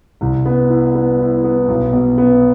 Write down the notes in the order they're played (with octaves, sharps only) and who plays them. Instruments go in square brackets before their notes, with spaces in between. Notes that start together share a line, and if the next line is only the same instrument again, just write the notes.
[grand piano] C2
B3
E4
B3
E4
B3
B1
B2
B3